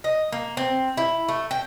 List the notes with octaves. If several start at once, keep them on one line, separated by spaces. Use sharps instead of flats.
D#5
A#3
C4
E4
A3
G5